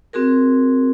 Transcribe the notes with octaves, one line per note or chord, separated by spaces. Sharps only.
C4 F#4 G#4 A#4